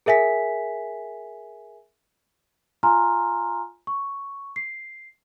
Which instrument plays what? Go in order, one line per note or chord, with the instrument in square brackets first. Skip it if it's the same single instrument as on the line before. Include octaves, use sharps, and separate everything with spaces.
[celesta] G#4 A#4 E5 G#5 B6
F4 F5 G#5 A#5 C6 F6
C#6
C7